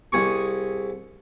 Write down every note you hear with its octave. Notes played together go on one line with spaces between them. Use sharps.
C2 G#4 C#6